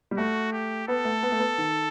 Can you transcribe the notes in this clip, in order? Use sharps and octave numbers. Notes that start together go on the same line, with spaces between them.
G3
A3 F#4
G4
B3 A4
A3
B3
A3
B3
D#3